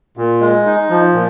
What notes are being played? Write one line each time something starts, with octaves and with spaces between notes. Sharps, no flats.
A#2
G#3
D#4
F3
A#2